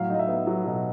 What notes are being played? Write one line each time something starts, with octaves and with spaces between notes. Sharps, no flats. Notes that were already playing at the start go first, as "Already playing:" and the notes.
Already playing: A2 F#3 F5
D#4 D#5
E5
B3
F#3
B2